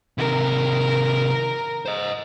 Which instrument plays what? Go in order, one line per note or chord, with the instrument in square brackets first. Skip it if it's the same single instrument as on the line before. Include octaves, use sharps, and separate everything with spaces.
[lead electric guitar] C3 D#3 [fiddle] A#4
[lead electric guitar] C5 D#5